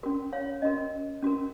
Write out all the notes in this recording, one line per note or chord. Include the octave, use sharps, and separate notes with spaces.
C#4 F#4 A#4
C#5 F5
C#4 F#4 A#4 D#5
C#4 F#4 A#4